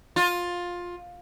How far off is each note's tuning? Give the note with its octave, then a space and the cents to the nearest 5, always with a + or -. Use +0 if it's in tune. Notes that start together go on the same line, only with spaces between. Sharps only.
F4 +15